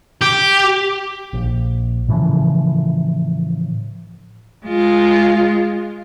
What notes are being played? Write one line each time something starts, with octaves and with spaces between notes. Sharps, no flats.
G4
A#1
A2 C#3 E3 F3
G#3 F4